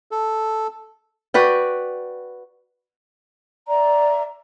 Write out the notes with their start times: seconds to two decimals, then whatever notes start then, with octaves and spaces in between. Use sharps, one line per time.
0.11 A4
1.34 F#4 B4 D5 G5
3.68 D5 E5 A#5